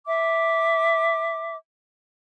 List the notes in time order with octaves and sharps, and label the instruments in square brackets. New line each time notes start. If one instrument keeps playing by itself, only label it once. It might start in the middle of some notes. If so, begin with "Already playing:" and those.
[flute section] E5 D6